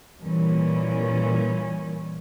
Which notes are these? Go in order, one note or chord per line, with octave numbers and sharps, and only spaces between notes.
A#2 E3 G3 C#4